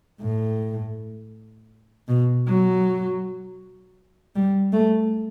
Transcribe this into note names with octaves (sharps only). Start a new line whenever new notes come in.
A2
B2
F#3
G3
A3